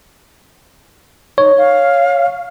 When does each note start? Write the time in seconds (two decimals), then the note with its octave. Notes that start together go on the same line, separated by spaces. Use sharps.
1.38 D#4 C#5
1.57 F5